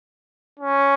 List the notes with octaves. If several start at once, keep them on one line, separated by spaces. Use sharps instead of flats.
C#4